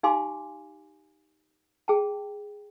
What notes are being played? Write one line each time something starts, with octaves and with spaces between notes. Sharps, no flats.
D#4 G4 F5 G#5 C6 D6
G#4 G5 A5